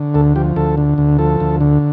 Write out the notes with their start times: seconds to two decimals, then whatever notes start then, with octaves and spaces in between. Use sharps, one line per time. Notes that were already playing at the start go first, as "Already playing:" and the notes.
Already playing: D3
0.14 D2 A4
0.36 F3 G4
0.56 D2 A4
0.78 D3
0.98 D2
1.19 F3 A4
1.40 D2
1.61 D3